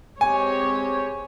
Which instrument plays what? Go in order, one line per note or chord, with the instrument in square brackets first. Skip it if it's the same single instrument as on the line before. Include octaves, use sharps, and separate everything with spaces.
[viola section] G#3 C4 G4 C#5 [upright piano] G#5